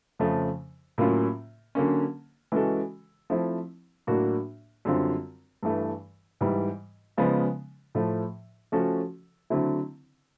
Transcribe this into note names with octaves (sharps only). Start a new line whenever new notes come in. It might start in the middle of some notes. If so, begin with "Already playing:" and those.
F2 C#3 F3 A3
A2 F#3 A#3 C#4 F4
D3 F#3 A#3 C#4
E3 G#3 C#4 F#4 A4
F3 A3 C4 E4
A2 F#3 A#3 D4 F#4
F#2 D3 G3 C4 F4
G2 E3 A3
G#2 E3 G3
C#3 F3 G#3 B3
A2 F3 A3
F3 A3 C#4 F#4 A4
D3 F#3 A3 C4 E4